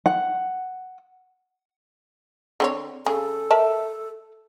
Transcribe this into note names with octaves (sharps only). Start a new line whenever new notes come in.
F#5
D3 C4 C#5
C#3 G#4 A4
A#4 E5 A5